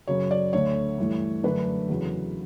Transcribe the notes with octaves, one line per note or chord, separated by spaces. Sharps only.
F#2 C#3 F#3 C#5
D5
D2 D3 A3 C#5
G2 E3 A3
F#2 D3 A3 D4 B4
E2 C#3 F#3